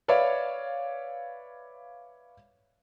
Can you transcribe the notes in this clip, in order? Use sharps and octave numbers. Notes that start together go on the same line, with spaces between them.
B4 C#5 D5 E5 F5